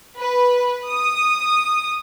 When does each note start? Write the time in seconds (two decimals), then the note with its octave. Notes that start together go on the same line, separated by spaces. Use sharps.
0.17 B4
0.88 D#6